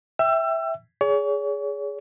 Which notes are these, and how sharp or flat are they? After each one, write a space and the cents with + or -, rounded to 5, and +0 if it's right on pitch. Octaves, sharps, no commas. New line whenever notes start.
E5 -5 G5 +0 E6 +30
G#4 +0 C#5 +40